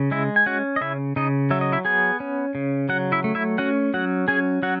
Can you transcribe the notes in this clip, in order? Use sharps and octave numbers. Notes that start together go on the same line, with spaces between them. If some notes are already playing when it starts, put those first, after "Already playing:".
Already playing: C#3
G#3 E4 E5
G#5
C#4 F#4 F#5
D#5
C#3 E4 E5
C#3 D#4 D#5
F#3 E5
D#5
E4 E5
B3 G#4 G#5
C#4
C#3
F#3 F#4 F#5
E4 E5
A3
E4 E5
C#4 F#4 F#5
F#3 F#4 F#5
C#4 G#4 G#5
F#3 F#4 F#5